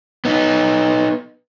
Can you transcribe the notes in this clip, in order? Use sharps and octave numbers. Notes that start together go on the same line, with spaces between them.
B3 D#4